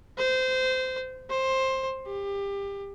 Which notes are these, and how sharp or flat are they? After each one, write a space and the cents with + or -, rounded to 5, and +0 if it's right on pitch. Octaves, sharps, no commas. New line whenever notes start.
C5 -20
C5 +15
G4 +25